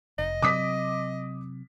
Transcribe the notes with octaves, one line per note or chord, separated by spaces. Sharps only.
F1 D#5
C3 F#3 C4 D6 D#6 B6